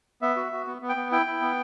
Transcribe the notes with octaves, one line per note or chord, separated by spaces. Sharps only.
B3 E5
F#4
F#4
B3
B3
G5
B3
E4 G5
E4
B3